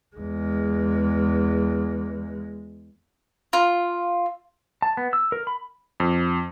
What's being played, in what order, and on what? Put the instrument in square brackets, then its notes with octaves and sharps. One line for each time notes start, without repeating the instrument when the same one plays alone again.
[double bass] E2 G#3
[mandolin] F4
[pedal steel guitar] A5
B3
E6
A#4
B5
[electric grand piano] F2